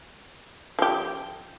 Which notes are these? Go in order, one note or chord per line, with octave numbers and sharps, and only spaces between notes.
F3 G4